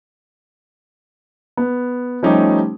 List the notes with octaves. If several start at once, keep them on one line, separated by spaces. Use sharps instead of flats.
B3
F3 G3 A3 C#4 D#4 G4